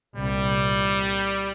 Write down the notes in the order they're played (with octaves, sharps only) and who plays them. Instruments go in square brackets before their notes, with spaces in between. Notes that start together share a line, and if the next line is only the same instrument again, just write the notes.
[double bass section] C2 A#2 [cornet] G3